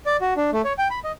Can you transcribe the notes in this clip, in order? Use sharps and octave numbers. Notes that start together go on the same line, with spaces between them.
D5
F#4
D4
A3
C#5
G5
B5
D#5